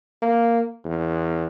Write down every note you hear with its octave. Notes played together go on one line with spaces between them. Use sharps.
A#3
E2